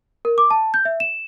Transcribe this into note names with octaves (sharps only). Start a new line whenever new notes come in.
A#4
D6
A5
G6
E5
E7